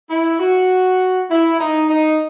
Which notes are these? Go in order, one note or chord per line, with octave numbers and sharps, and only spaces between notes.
E4
F#4
E4
D#4
D#4